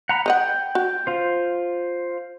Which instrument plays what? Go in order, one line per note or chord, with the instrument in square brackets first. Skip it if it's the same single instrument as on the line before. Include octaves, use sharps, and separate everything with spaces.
[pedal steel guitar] F#5 A#5 B5
[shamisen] B4 D#5 F#5 [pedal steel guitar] G5
[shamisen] F#4
[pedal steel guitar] F4 C5